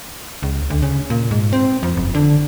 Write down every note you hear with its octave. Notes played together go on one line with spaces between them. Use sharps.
C#2
D2
C#3
A#2
G#2
C4
F2
F#1
D3